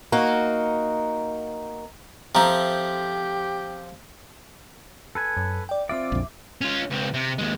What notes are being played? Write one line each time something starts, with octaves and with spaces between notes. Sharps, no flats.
A#3 D#4 F#4
F3 C4 G4 A4 E5 A#5
A4 B4 G#5
F#2
D5 G5
C4 F4 D5 E5 D6
A#1 F2
C#4 F4
C#2 C4
C3
D#2 G#3